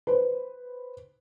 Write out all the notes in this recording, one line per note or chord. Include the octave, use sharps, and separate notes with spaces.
B4 C5